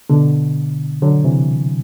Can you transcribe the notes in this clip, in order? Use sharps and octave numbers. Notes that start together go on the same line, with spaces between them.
B2 D3
D3 F#3
C3 E3